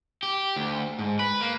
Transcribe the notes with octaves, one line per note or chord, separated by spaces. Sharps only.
G4
D2
G#2
B4
A#3